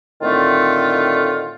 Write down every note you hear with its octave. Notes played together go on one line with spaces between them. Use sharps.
A2 D3 D#3 A3 C4 F4